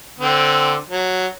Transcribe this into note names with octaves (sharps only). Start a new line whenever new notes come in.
D3 C4
F#3